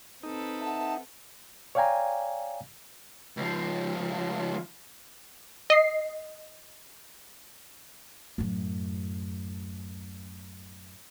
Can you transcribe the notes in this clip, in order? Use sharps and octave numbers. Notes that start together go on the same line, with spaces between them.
C4 D#4 A4 B4
E5 F#5 A5
C#5 D5 F5 G5 G#5 A#5
C#2 F3
D#5 C7
F#2 A2